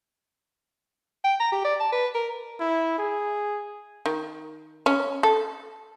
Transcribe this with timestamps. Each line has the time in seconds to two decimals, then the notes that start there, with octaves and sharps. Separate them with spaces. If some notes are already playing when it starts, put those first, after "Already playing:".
1.24 G5
1.40 A#5
1.52 G4
1.64 D5
1.80 A5
1.92 B4
2.15 A#4
2.60 E4
2.98 G#4
4.06 D#3
4.86 C#4
5.23 A4